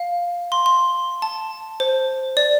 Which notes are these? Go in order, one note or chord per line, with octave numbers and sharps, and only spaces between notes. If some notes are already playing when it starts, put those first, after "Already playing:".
Already playing: F5
C6
C6
A5
C5
D5